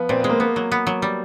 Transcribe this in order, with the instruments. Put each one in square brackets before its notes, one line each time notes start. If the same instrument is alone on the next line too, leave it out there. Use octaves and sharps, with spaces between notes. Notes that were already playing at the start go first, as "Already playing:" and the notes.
Already playing: [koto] F3 [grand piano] B3
[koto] A#2 [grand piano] C4
[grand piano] B3
[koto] G#3
[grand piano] A#3
[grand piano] A#3 [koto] B3
[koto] F#3
B3
F#3
G3